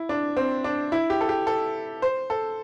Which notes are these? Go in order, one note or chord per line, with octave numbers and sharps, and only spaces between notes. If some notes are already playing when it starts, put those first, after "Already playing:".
Already playing: E4
D4
C4
D4
E4
G4
A4
G4
A4
C5
A4